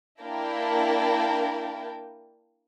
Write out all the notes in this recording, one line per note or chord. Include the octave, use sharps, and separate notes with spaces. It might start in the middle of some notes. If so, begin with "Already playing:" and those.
A#3 D4 E4 A#4 G5 A5